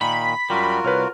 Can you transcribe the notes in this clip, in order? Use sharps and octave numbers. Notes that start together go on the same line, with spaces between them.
A#2 D#3 B5
F#2 G3 F4 F#4 A#4
C2 B4 C#5 F6